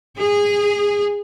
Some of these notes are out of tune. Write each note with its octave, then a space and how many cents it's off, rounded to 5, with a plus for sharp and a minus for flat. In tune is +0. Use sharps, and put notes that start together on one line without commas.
G#4 -20